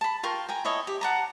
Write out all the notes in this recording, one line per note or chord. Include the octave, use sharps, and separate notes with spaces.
A5 B5
F4 A#4 G5 C#6
G5 G#5 A#5
E4 A4 C#5 D#5
G4
F#5 A5 A#5